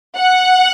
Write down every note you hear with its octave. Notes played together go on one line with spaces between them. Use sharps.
F#5